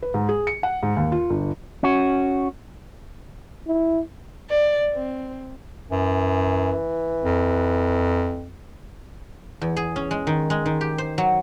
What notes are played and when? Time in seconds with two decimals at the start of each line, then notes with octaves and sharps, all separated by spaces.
0.02 B4
0.14 G#2
0.29 G#4
0.47 C#7
0.63 F#5
0.83 G#2
0.97 D#2
1.12 F4
1.30 G1
1.83 C#4 F#4
3.67 E4
4.50 D5
4.94 C4
5.91 F#2 E3
7.24 F2
9.62 E2
9.77 G#4
9.96 C#4
10.11 G#3
10.27 D#3
10.50 G#3
10.66 D#3
10.81 G4
10.98 C5
11.18 F#3